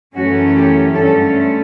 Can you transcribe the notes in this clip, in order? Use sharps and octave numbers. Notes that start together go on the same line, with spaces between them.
F#2 E3 A3 C#4 F#4
G4
G2 D3 A3 C#4 A4